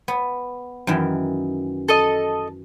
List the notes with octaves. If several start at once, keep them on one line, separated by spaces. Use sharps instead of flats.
B3
F#2 D#3 E3
A4 D#5